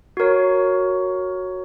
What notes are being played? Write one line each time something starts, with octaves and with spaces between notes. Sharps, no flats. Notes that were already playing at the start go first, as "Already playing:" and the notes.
F#4 A#4 C#5